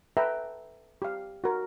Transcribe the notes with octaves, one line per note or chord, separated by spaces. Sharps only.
A4 B4 E5 G5 A#5
G4 F5
F#4 A#4